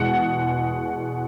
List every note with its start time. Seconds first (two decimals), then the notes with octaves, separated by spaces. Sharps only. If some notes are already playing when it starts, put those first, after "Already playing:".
Already playing: E2 B2 G#3 F#5